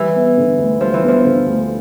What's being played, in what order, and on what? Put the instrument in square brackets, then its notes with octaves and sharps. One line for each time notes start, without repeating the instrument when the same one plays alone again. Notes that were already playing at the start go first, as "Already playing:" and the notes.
Already playing: [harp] E3 [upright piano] G3
[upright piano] B3
D3
D2
[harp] F3 [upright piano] G3
[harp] E3
[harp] F3 [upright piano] B3
[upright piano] D3
D2